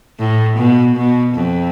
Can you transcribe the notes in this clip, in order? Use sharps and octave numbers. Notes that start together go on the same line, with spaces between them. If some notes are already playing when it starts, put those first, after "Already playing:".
A2
B2
B2
F2